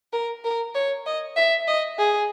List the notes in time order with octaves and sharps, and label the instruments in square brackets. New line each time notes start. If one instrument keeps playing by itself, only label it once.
[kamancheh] A#4
A#4
C#5
D#5
E5
D#5
G#4